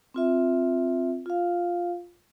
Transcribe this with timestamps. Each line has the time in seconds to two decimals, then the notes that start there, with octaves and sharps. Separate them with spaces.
0.14 C4 F4 E5
1.26 F4 F5